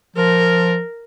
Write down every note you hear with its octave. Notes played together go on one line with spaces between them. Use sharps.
F3 A#4